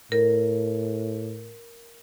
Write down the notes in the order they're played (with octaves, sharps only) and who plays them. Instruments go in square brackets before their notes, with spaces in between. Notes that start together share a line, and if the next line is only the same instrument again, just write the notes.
[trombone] A2 [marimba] A#4